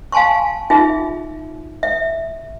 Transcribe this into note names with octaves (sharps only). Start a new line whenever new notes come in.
F5 G#5 A5 C6 C#6
D#4 F4 G#4 E5
E5